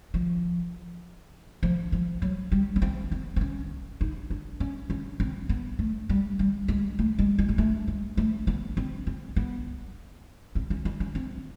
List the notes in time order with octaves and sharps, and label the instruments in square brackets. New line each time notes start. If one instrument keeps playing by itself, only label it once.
[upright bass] F3
F3
F3
F#3
G3
B3
C4
C4
C4
C#4
D#4
D4
C#4
C#4
C4
B3
A3
G3
G3
G#3
A3
G#3
G#3
G#3
A3
G#3
A3
B3
C4
C4
B3
C4
C#4
D4
C#4
C4